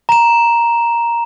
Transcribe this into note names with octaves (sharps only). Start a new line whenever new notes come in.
A#5 E7